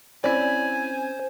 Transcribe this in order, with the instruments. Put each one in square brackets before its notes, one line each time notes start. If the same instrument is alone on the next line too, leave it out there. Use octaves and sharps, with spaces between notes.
[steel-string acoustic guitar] C4 C#4 [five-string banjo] E4 D5 [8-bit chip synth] C5 [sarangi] G#5